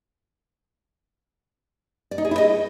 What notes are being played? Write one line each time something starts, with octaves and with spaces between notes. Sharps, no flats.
D5
D#4
G#4
E4
D#5